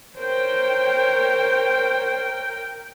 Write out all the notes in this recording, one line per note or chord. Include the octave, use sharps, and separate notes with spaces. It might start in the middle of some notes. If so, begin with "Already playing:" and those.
A#4 C5 C#5 G5